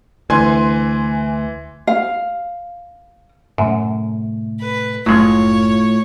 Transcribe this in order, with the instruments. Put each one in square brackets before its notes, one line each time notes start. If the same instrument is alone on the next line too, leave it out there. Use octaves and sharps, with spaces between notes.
[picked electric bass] D2 [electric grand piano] E3 G#5 C6
[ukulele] F5
[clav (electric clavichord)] F#2 [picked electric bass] A2 C3 A3
[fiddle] B4
[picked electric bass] F#1 [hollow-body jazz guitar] A2 F4 [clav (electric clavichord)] F#3 G#3 [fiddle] C#5